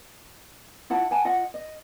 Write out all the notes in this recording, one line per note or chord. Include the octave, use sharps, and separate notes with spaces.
E4 F4 F#5 A5
F#5 G#5 A5
F4 D#5 F#5
D#5